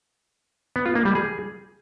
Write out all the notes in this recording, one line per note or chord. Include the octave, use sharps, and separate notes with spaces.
B3
F4
A#3
G3
G#4